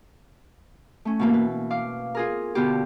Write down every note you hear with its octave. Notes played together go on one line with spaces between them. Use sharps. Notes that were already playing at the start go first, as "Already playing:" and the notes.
A3 C#4
B2 E3 A#3
B4
F5 D6
F4 G#4 A#4
B2 D3 B3 F4 G4